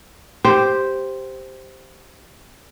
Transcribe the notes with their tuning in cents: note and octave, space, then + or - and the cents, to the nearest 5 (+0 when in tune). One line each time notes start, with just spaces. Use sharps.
G4 +0 C5 +0